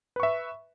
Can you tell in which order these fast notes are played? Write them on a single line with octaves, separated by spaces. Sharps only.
B4 C#6 E5